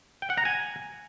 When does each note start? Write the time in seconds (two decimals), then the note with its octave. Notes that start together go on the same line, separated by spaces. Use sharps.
0.22 G5
0.30 F#5
0.38 A#5
0.45 G#5